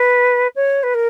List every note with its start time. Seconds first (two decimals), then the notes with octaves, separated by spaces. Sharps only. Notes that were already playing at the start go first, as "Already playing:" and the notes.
Already playing: B4
0.55 C#5
0.83 B4
0.94 A#4